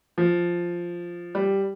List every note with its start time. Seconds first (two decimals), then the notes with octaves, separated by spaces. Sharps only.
0.18 F3
1.35 G3